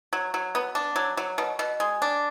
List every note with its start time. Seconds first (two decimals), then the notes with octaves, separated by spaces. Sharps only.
0.13 F#3
0.34 F#3
0.55 B3
0.75 D4
0.96 F#3
1.17 F#3
1.38 B2
1.59 B2
1.80 G#3
2.02 D4